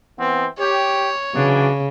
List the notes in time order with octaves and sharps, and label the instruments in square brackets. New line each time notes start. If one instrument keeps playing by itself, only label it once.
[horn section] E3 B3 C4
[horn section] G4 [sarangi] C#5
[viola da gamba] C#3 [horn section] E3 F#3 D4